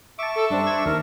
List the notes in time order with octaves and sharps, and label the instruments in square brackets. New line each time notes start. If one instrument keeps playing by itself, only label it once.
[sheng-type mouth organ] E5 C#6 [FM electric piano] A5 D6
[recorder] A4
[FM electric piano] G2 C4 [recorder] D4
[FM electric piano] C5 E6 G#6
[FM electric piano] D#2 [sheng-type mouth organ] A#4